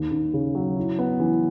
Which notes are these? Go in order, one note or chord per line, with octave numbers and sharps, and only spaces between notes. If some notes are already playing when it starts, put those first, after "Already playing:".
Already playing: D#2
D#2
C#3
F#3
E4
B3
E3